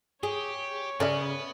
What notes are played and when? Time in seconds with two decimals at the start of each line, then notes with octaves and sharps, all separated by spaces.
0.23 G4 G#4 C#5
1.00 C#3 B3 C#4 D5 E5